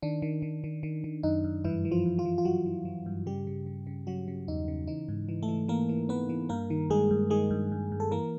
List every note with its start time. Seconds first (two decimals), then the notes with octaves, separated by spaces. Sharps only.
0.02 D#3 D4
0.22 D#3
0.42 D#3
0.64 D#3
0.83 D#3
1.04 D#3
1.23 F#2 D#4
1.44 F#2
1.64 G2 E3 E4
1.85 E3
1.91 F3 F4
2.05 G2
2.18 F3 F4
2.25 E3
2.38 F4
2.45 E3 F#3 F#4
2.66 E3
2.85 E3
3.06 G2
3.26 C#3 G3 G4
3.47 C#3
3.66 C#3
3.87 C#3
4.07 C#3 F#3 F#4
4.28 C#3
4.48 E2 D#4
4.68 C#3
4.87 E3 D#4
5.09 G#2
5.29 E3
5.43 A3 A4
5.49 E3
5.68 E3 A#3 A#4
5.89 E3
6.09 E3 B3 B4
6.29 E3
6.49 G2 A#3 A#4
6.70 D#3
6.90 G2 G#3 G#4
7.11 G2
7.30 D#3 G#3 G#4
7.50 G2
7.72 G2
7.92 G2
8.00 A4
8.11 E3 A#3 A#4